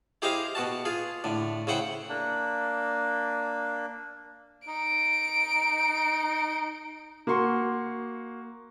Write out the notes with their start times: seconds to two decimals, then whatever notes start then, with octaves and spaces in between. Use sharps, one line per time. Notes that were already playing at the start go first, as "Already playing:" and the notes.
0.22 E4 G4 G#4 C5 D#5 F5
0.55 B2 F#4 A5
0.85 F4 G#4
1.24 A2 D3
1.67 C#3 E4 C5 F#5 G5
2.09 A#3 D4
4.68 D#4 D7
7.27 A#3 F#4 C6 C#6